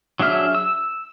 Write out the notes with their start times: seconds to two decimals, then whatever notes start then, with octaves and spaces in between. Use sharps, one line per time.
0.20 F#3 D4 G#4 E5 F6
0.55 E6